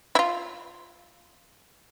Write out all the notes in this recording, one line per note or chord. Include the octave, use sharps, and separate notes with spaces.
E4
F4